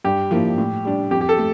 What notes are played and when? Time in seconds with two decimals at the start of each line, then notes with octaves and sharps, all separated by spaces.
0.05 G2 G4
0.31 F3 A#3 E4
0.58 A2
0.85 G3 D4
1.11 F2 G4
1.21 G4
1.29 A4
1.38 A3